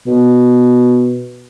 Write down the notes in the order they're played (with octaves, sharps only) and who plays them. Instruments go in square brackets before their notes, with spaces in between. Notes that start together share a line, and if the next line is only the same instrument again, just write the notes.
[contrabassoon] B2